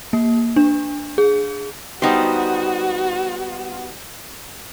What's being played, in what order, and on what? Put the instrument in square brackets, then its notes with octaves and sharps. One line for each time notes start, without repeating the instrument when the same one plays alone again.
[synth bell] A#3
D4
G#4
[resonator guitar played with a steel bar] G3 D#4 C5 [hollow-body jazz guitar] B3 G4 [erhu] F#4